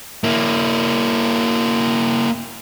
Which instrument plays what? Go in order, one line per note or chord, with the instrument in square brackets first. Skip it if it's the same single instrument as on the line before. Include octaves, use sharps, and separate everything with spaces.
[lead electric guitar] A#3 E4